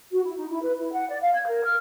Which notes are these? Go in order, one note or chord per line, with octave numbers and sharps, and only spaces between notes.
F#4
E4
D#4
E4
B4
E4
F#5
D5
F5
G#6
A#4
F6